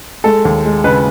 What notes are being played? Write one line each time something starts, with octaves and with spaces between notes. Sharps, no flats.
G#3 A4
D#2
G#3
C#3 B4